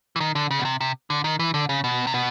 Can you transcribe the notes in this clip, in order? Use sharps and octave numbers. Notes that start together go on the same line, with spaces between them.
E3
D#3
D3
C#3
B2
C3
C3
D3
D#3
E3
D3
C#3
B2
C3
B2